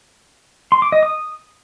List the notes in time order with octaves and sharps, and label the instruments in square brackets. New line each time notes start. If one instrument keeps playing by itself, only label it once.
[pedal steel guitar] C6
D6
D#5
D#6